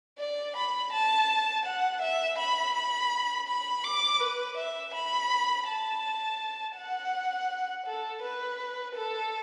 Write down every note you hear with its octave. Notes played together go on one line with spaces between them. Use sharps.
D5
B5
A5
F#5
E5
B5
B5
B5
D6
B4
E5
B5
A5
F#5
A4
B4
A4